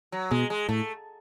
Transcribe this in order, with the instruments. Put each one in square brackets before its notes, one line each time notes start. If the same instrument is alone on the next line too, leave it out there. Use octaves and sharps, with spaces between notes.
[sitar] F#3
[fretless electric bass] B2 [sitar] G#3
[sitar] G#3
[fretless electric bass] A2 [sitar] A3